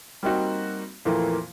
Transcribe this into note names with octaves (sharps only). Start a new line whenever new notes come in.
G3 A#3 C4 D#4 F#4
F2 A#2 E3 A3 A#3